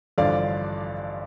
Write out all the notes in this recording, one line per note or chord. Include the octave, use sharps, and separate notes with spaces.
A1 G2 D3 F3 D5 F5